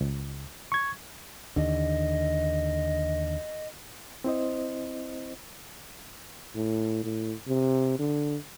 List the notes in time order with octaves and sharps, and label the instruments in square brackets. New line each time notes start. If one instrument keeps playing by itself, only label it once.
[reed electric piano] C#2
C#6 G#6
[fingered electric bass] D#2 D3 [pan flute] D#5
[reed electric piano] C4 E4 C5 D#5
[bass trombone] A2
A2
C3
D3